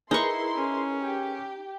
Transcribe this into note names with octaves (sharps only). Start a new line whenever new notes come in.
D#4 E4 G#4 A#4 B4 C6 C#6
C#4
G4